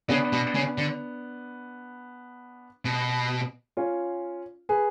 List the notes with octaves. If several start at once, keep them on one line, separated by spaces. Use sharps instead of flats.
C#3 B3 D4
B2
C#3
D3
B2
C#4 F4
G#4 B4